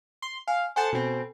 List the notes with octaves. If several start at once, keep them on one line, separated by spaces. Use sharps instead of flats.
C6
F5 G#5 F6
A4 C5 F#5 G#5 A5
B2 C4